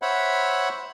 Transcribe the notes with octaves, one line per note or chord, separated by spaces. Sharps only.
C5 C#5 E5 F#5 B5